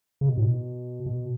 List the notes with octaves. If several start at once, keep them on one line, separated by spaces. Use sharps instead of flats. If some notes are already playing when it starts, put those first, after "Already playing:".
C#3
B2
A2
B2
B2